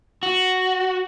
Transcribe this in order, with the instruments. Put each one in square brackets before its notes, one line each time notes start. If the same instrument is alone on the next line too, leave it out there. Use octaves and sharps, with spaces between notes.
[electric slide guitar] F#4